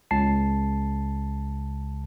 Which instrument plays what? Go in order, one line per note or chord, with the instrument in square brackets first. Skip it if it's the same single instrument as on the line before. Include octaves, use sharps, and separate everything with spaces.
[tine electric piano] C#2 C#3 A5 C7